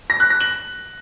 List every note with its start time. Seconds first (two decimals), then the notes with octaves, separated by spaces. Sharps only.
0.10 A#6
0.20 F#6
0.30 A#6
0.41 F#7